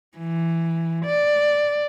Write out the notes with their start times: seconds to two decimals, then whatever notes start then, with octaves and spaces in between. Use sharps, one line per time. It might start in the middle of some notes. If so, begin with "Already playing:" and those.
0.17 E3
1.05 D5